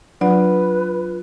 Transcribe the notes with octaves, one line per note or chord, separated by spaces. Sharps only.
F#3 D4 F4 B4 F#5